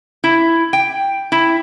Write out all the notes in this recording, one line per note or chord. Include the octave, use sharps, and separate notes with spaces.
E4
G5
E4